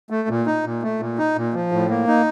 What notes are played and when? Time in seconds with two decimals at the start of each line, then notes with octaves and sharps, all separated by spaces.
0.10 A3
0.29 A#2
0.47 D#4
0.65 A#2
0.83 A3
1.00 A#2
1.18 D#4
1.36 A#2
1.54 F3
1.72 A2
1.89 A#3
2.07 D#4